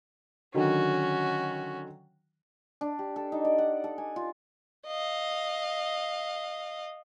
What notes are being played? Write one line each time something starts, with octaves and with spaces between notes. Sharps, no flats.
D3 D#3 F#3 C#4 F#4
D4
G4
A4
D#4
D5
F#5
A4
G#5
F4
D#5 F5